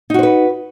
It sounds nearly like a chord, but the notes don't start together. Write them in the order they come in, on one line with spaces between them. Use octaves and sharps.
D#4 F#4 C5 B4